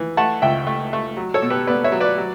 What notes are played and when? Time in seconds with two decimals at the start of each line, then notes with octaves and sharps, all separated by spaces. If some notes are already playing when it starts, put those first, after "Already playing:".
Already playing: E3
0.17 A3 F#5 A5
0.42 C#2 E5 G5
0.67 A3
0.93 A3
1.17 F#3
1.34 A4 C#5
1.42 B2
1.50 G4 B4
1.67 B3 B4 D5
1.84 C#5 E5
1.92 F#3
2.00 B4 D5
2.18 F#3